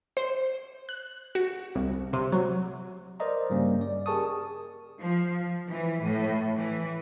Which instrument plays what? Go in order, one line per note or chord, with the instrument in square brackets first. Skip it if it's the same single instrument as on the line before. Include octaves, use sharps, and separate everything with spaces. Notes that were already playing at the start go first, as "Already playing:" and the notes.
[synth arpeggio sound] C5
F#6
F#4
C2
C3
F#3
[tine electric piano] A#4 C5 D5 D#5 A#5
G2 C#3 G3 A#3 C#4
D5
G4 G#4 A#4 A5 C#6 D#6
[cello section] F3
E3
A2
E3